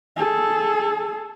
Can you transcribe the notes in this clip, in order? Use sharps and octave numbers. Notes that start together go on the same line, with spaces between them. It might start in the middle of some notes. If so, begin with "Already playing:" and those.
G#4 A4